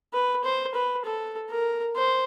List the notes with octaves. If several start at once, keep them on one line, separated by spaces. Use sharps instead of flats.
B4
C5
B4
A4
A#4
C5